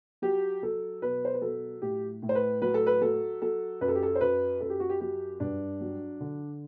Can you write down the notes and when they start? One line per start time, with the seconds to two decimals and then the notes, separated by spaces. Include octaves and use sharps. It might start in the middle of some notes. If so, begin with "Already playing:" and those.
0.22 F#3 G4
0.63 F#3 A4
1.02 B2 B4
1.25 C5
1.34 B4
1.42 F#3 A4
1.82 A2 G4
2.22 A2
2.29 C5
2.35 B4
2.62 F#3 B4
2.74 A4
2.87 B4
3.01 F#3 A4
3.42 F#3 A4
3.81 F#2 B4
3.88 A4
3.95 G4
4.03 A4
4.15 C5
4.21 F#2 B4
4.60 F#2 A4
4.70 G4
4.80 F#4
4.90 G4
5.01 F#3 G4
5.40 G2 D4
5.81 F#3
6.20 D3